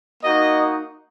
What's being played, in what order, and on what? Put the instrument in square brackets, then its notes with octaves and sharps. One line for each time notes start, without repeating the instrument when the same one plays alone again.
[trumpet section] A#3 D#4 F#4 D#5